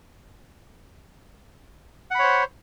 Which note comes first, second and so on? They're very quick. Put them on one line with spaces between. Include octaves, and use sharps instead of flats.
F#5 B5 C#5 C5